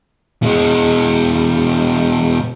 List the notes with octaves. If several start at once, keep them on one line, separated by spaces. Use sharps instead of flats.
B2 G#3